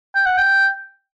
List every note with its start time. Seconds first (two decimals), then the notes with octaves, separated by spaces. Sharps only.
0.15 G5
0.26 F#5
0.38 G5